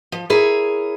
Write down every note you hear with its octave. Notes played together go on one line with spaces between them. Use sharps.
F3
E4 G#4 A#4 C#5